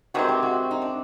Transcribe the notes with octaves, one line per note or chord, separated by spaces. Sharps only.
C3 D#3 G#3 C4 F#4
G4
F#4
D#4
D4